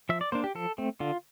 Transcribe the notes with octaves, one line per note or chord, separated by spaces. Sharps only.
F3 E5
D5
A#3 D4 C5
G4
F3 A4
A3 C4
D3 F4